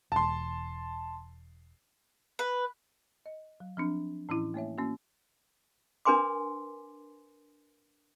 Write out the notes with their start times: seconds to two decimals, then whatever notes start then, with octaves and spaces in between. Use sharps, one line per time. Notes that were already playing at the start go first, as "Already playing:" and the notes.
0.12 E1 E2 A5 C6
2.39 B4
3.26 D#5
3.60 F#3
3.77 F3 C4 D4
4.29 A2 E3 C#4 E4
4.54 A3 A#3 C#5 E5
4.78 A#3 C#4 F#4
6.05 D4 A#4 B4 G#5 C6 D6